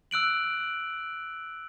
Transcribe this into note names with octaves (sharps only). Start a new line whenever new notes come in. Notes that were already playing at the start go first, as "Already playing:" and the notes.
E6 F#6 D7 F#7